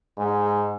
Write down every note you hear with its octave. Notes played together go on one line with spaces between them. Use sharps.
G#2